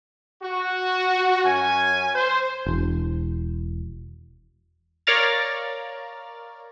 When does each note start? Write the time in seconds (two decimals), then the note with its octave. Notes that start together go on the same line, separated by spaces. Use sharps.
0.43 F#4
1.44 F#2 C#4 G#5
2.15 C5
2.66 E1
5.07 A#4 C#5 D5 F5 A#5 A6